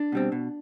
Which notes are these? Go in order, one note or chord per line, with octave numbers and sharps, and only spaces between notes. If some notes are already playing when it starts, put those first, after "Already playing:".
Already playing: D4
B2 G3 C4
B2